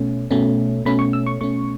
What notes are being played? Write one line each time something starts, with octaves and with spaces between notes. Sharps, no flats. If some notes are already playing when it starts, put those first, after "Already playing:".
Already playing: B2 A3 C#4
B2 A3 C#4
B2 A3 C#4 B5
C#6
E6
C#6
B2 A3 C#4 C#6